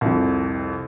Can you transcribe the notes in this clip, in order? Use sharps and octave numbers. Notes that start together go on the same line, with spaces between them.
C2 F2